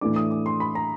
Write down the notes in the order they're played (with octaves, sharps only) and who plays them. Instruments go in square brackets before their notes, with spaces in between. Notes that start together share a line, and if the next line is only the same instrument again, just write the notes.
[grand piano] A2 E3 A3 D4 D6
D#6
D6
C6
B5
A#5